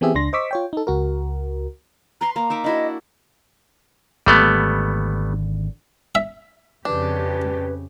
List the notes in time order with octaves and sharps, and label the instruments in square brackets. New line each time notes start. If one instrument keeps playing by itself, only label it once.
[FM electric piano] E3 B3 C4 G4 G#4 E5
C#2 D4 C6 A#6
C5 D#5 C#6 D6 E6 B6
F4 C#5 G5
D#4 A4
C#2 F#4 A#4
[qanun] B4 C6 [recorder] A#5
[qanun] A#3 [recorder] A#5
[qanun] D#4 E5 D6
[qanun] D4 E4 F#4 [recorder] D#5
[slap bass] G#1 D3 [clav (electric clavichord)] G3 A3 B3
[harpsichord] E5
[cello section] F2 C#3 G4 [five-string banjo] D4 [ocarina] B4